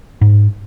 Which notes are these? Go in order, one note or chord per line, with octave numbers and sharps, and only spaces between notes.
G#2